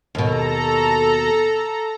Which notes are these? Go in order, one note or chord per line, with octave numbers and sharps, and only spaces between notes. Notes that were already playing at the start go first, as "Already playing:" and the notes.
D#2 B2 A4 A#5